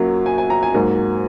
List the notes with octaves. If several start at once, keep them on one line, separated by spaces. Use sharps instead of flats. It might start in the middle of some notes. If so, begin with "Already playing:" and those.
Already playing: F#2 F#3 A#3
G#5
G#5
A#5
G#5
G#2 F#3 A#3